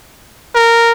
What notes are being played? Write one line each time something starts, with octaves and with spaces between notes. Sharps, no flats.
A#4